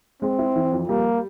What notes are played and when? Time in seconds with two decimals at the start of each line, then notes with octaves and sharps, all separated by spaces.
0.22 G#3 C4
0.39 E4
0.56 E3
0.72 F2
0.89 G3 A#3